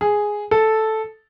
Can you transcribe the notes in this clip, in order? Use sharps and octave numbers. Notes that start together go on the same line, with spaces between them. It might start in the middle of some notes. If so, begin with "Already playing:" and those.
G#4
A4